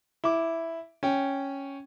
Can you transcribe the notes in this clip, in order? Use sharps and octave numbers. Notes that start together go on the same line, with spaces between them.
E4 D6
C#4 G5